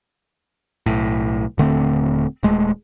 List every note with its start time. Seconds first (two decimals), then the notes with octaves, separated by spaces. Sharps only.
0.86 B1 A2
1.58 D#1 D3 A3 C4
2.43 D#1 G#3 A3